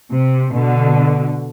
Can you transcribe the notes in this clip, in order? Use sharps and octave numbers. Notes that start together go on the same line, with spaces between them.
C3
B2 D3